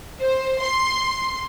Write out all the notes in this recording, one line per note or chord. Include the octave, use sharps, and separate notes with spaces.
C5
C6